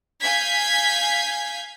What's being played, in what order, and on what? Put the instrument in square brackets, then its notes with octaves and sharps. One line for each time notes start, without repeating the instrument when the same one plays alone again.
[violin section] F5 G#5 G6 G#6 B6